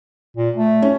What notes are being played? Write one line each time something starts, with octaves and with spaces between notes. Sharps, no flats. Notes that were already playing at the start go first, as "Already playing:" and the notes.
A#2
A3
C#4